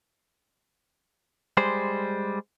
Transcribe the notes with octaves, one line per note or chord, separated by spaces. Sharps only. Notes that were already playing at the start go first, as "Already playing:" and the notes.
G3 G#3 C5